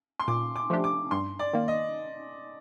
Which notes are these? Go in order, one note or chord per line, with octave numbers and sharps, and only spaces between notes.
C6
A#2 D6
D6
F3 A3 D4 G4
D6
G2 C6
D5
D#3 A#3
D#5